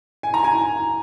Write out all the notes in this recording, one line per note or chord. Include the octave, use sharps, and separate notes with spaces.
G#5
A#5
G#5